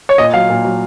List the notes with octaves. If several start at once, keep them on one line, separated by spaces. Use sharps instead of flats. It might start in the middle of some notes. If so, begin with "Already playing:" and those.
C#5
A#2 D#5
F#3 F5
A#2
F#3